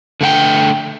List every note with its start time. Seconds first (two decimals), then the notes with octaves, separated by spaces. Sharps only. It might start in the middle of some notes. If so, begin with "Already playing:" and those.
0.21 D3 A3 F#5 G5